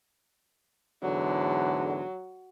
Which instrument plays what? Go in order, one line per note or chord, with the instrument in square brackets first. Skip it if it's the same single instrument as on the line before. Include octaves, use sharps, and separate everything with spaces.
[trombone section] E2 G#2 D3 [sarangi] F#3